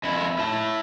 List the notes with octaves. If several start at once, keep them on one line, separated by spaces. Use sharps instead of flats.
F2 E4
E4 A5